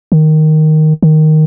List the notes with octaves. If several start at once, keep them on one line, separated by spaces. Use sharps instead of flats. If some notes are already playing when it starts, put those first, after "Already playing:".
D#3
D#3